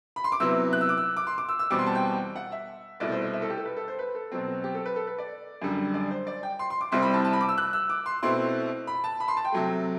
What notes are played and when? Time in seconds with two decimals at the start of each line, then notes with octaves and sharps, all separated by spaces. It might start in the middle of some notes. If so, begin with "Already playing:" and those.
0.16 B5
0.24 C6
0.32 D6
0.40 C3 F#3 B3 E4 E6
0.73 F#6
0.81 E6
0.89 D6
0.97 E6
1.17 D6
1.27 C6
1.38 D6
1.49 E6
1.59 E6
1.70 E2 B2 G3 C4 D6
1.79 C6
1.86 A5
1.95 G5
2.36 F#5
2.52 E5
3.00 C2 B2 A3 E4 D5
3.12 C5
3.22 C5
3.33 E5
3.42 A4
3.50 G4
3.58 A4
3.65 B4
3.77 A4
3.88 C5
3.99 B4
4.15 A4
4.32 B2 F#3 C4
4.64 G4
4.75 A4
4.86 B4
4.96 A4
5.07 B4
5.18 D5
5.61 F#2 D3 G3
5.94 D5
6.11 C5
6.27 D5
6.43 G5
6.59 C6
6.70 C6
6.81 D6
6.92 C2 C3 G3 C4 E4 C6
7.02 B5
7.14 A5
7.24 A5
7.33 B5
7.41 D6
7.49 E6
7.58 F#6
7.73 E6
7.90 D6
8.06 C6
8.23 B2 A3 C4 E4 C6
8.87 B5
9.04 A5
9.20 B5
9.28 C6
9.37 A5
9.45 G5
9.52 C3 F#3 A3